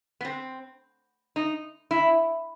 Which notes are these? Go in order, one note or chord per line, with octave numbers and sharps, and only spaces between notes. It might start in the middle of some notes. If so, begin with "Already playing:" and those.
B3
C4
D#4
E4